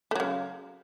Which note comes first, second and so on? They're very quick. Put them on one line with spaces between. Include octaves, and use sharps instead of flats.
A3 F#3 C#3